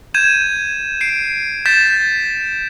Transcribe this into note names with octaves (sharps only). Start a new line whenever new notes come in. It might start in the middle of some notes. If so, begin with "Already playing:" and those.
G6 G#6 D#7 E7
C7 D7
G6 A6 B6 E7